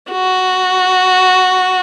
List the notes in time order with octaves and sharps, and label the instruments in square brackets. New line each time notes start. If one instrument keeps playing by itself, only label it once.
[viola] F#4